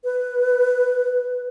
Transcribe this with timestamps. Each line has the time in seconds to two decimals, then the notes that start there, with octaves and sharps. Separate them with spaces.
0.04 B4